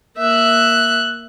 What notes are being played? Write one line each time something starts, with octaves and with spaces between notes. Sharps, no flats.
A#3 E5 F#6